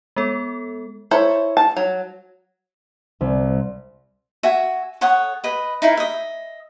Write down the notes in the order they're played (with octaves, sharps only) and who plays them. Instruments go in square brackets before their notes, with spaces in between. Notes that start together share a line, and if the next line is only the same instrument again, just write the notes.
[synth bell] G#3 B3 A4
[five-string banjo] E4 A4 C5 C#5
A5
F#3
[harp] C2
[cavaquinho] F#4 E5 G#5
A4 C#5 F#5 D#6
B4 D#5
D#4 E4 A#4
D#5 E5